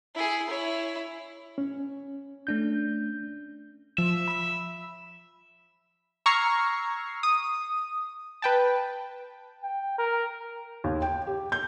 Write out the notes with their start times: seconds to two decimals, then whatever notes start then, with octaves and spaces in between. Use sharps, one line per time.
0.15 E4 G#4
0.49 E4 C#5
1.58 C#4
2.47 A3 D4 G6
3.98 F3 E5
4.28 B5 E6
6.26 A#5 C#6 E6 F6 G#6 C7
7.23 D#6
8.42 B4 G5 A5
9.63 G5
9.99 A#4
10.84 D#2
11.02 G5
11.27 G4
11.52 G6